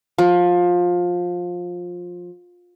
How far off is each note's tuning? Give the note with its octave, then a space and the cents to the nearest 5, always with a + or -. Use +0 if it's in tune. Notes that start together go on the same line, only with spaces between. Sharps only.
F3 +20